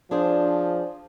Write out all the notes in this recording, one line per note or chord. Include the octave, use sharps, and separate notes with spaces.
F3 D4 G#4 C5